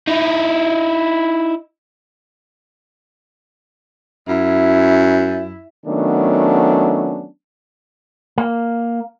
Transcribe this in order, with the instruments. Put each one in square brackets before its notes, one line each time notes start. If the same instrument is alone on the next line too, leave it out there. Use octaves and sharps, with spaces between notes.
[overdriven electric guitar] D#4 E4
[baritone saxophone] F#2 [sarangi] E4
[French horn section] D#3 F#3 A3 B3 C#4 D4
[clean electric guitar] A#3